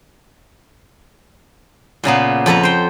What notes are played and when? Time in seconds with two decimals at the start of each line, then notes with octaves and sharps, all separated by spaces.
2.04 A#2 C#3 A#3 B3
2.46 F2 A4 B4 A#5
2.63 C5 G5